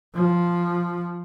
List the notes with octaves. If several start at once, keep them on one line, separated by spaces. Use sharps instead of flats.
F3